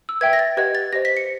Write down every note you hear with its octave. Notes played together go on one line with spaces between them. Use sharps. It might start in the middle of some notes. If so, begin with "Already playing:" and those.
E6
B4 E5 G5 G#6
A#6
A6
G4 B4 D#5 F#5 G#6
A6
G4 C5 D#5 A#6
B6
C#7